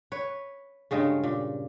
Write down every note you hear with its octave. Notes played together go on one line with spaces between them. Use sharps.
B4 C#5
G2 C#3 G#3 A3
A#2